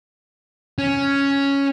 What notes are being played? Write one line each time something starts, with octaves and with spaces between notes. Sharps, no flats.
C#4